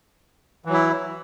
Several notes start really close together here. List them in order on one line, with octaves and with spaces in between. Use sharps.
E3 F#3 E4